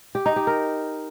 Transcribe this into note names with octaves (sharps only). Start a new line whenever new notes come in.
G4
D#4
G4
A#4